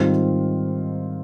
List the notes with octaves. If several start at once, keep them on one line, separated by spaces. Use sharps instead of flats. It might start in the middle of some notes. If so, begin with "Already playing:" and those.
Already playing: G#2 D#3 G3 C4 F4